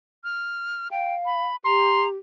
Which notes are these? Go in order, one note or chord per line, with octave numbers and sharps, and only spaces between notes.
F6
F5 G5
B5
G4 A#5 C6